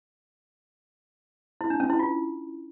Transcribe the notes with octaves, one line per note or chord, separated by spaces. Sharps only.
E4
D4
C#4
E4
F4